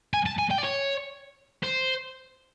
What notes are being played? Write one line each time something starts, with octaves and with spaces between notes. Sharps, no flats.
G#5
A5
G#5
G5
D5
C#5
C5